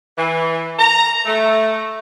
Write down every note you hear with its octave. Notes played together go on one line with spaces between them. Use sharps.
E3
A#5
A3